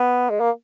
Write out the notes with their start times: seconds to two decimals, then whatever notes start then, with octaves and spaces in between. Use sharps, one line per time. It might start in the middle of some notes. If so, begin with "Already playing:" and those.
Already playing: B3
0.30 G#3
0.40 A#3